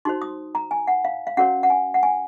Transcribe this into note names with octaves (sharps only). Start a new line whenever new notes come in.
D#4 F#4 C5 C6
D#6
A#5
G#5
F#5
F5
F5
C#4 F#4 A#4 C#5 F#5
F#5
G#5
F#5
G#5